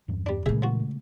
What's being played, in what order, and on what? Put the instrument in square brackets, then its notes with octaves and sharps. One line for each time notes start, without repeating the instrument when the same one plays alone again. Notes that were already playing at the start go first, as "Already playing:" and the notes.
[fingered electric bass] E2 G2
[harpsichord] G3 D4
[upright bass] A#2 E3 [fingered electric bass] C#3 G#3 A3 [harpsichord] G#4 E5
[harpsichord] F3 F#4